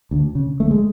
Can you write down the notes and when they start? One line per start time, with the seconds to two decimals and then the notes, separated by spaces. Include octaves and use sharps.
0.11 D2
0.35 C#3
0.60 D2 A3
0.71 G#3